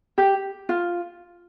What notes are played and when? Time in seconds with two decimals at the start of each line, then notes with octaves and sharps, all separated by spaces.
0.18 G4
0.69 F4